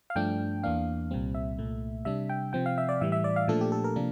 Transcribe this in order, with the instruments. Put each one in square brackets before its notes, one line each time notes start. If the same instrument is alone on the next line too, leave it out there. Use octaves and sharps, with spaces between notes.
[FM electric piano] F5
G2 F3 A3 D4 G5
E2 E3 A#3 D4 F5
C2 A#2 G3 C4
E5
C2 A#2 A3
C3 G3 D4 E5
G5
C3 F3 C4 G5
F5
E5
D5
A2 E3 G3 E5
E5
D5
F5
A#2 F3 A3 D4 A4
G4
A4
A#4
C3 F3 A#3 D4